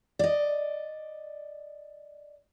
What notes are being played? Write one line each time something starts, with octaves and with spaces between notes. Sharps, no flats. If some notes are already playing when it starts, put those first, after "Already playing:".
D5 D#5